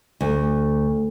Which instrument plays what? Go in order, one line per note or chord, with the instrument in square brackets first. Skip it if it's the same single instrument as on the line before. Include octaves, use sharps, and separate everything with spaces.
[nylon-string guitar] D2